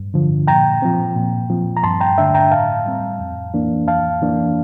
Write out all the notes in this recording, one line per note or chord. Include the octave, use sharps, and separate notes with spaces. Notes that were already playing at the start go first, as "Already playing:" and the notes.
Already playing: G2
D3 F3
A#2 G5 A#5
F3 C4
A#2
F3 C4
A#5
G2 A5 C6
G5 A#5
D3 A3 D4 E5 G5
G5 A#5
A2 F5 A5
G3 C4
F2
E3 A#3 D4
F2 F5 A5
E3 A#3 D4